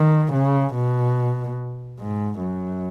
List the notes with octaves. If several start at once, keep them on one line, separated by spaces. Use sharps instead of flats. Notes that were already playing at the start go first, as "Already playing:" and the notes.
Already playing: D#3
C#3
B2
G#2
F#2